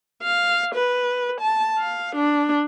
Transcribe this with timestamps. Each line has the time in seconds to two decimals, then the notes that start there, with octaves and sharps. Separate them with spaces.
0.23 F5
0.75 B4
1.41 A5
1.78 F5
2.16 D4